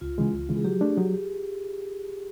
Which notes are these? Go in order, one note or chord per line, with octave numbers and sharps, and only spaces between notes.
C#2 F4
C#3 E3 G#3
C#2
C#3 E3 G#3
G#4
F#3 G4
A3 D4
F#3